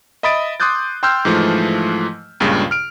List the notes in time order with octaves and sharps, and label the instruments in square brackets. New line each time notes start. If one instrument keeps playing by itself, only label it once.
[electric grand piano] D#5 E5 B5 D#6 A6 D7
C6 D6 D#6 F#6 G6 A6
G5 C6 E6 F6 G6
G#2 E3 F3 A3
C#2 G2 A#2 C#3
F6 D7